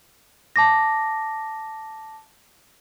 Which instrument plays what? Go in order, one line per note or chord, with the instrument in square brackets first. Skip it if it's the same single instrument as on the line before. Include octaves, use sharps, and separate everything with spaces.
[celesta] A5 D6 A#6